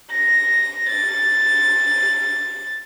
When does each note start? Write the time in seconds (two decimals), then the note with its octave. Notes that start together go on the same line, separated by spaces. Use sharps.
0.10 A#6
0.89 A6